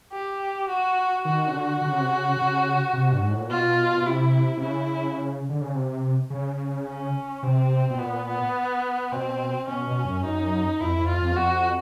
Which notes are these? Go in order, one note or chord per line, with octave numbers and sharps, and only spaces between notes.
G4
F#4
D#3 F#4
C#3
D3
D3
C#3
C3
C#3
C#3
C3
G2
G#2
A2
A#2
B2 F4
B2
C3 E4
C3
C#3 E4
D3
C#3
C3
C#3
C#4
C3 C4
B2
A#2 B3
B3
B2 C4
B2 C#4
B2
F#2
F#2 D#4
F2 E4
F2
F4
F2
E2
F2 F#4